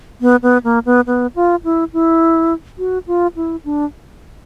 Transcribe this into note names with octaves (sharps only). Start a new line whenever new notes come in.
B3
B3
A#3
B3
B3
F4
E4
E4
F#4
F4
E4
D4